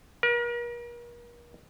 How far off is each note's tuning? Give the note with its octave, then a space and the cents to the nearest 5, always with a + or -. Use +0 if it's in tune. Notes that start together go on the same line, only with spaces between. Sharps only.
A#4 +40